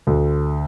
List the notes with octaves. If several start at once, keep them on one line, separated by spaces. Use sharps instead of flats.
D2